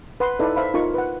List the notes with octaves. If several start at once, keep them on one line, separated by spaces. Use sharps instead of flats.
B4 F#5 C6
D#4 E4 A4 B4 D5
C5 E5 F5 B5
D#4 F4 A#4 C#6
B4 F#5